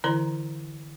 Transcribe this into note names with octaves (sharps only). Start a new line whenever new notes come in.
D3 E3 E4 D5 A#5 C6